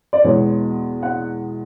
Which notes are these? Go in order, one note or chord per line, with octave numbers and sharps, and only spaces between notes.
D5
E2 B2 G#3 B3 C#5
F#5